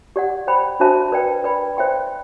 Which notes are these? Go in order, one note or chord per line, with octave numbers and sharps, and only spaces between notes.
G4 D5 F#5
C5 G5 B5
D4 F#4 C5 E5 A5
B4 D5 G5
B4 D5 G5 B5
C5 E5 G5 C6